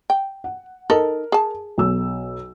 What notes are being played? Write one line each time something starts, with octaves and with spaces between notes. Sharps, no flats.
G5
F#5
D#4 A4 A#4
G#4 A5
B1 E6